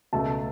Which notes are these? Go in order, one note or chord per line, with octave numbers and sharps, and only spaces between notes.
C#2 B2 A3 A5